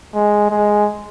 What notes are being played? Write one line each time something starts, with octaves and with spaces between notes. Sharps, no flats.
G#3
G#3